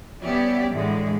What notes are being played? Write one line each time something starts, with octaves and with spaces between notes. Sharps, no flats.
G3 B3 C#4 G4 D5 E5
A2 D3 E3 G#3